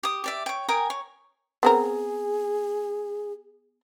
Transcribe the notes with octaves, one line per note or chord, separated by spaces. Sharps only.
G4 D#6
G4 D5 E5
C#5 G5
A#4 G5 G#5 D#6
C#5
B3 C4 G#4 A#4